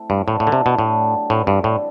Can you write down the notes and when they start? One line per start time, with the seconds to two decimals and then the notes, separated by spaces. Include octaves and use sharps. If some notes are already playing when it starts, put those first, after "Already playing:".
Already playing: A3 C4 E4
0.10 G2
0.26 A2 E3 B3 D4 A4
0.40 A2
0.47 D3
0.52 C3
0.66 B2
0.78 A2 F#3 A3 D4 G4
1.30 A2 D3 G3 C4 E4
1.47 G2
1.64 A2